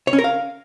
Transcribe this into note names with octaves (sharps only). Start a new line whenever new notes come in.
C#5
C#4
A#4
F5